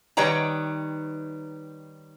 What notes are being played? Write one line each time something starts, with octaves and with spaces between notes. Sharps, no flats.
D#3 G3 B4 C#5 G5 A#5